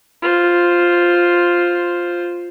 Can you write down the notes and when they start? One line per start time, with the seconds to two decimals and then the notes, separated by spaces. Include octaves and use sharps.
0.22 F4 C5